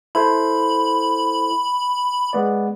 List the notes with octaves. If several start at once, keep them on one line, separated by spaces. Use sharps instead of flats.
E4 A4 C5 B5
G#3 B3 D5